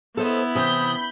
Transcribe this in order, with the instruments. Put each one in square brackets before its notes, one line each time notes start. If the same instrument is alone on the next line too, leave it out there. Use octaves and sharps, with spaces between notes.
[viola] B3 E4 [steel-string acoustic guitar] A4 C5 D#5
[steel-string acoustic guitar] C3 E3 [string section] B5 G6 [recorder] D#6